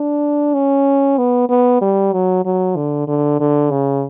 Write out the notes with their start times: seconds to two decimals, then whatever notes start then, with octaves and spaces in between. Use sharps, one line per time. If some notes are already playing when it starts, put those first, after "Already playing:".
Already playing: D4
0.54 C#4
1.18 B3
1.49 B3
1.81 G3
2.12 F#3
2.45 F#3
2.76 D3
3.07 D3
3.40 D3
3.71 C#3